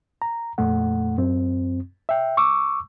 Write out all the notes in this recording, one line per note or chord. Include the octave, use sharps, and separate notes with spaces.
A#5
F2 A#2 A3 F#5
F#2 C4
E5 G5
C#6 D6 E6